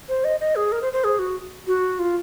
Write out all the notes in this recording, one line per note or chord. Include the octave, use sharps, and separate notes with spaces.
C5
D#5
D#5
G#4
A#4
C5
C5
G#4
F#4
F#4
F4